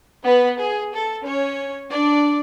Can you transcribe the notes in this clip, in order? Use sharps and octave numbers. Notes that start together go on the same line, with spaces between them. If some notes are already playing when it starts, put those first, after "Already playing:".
B3 B4
G#4
A4
C#4 C#5
D4 D5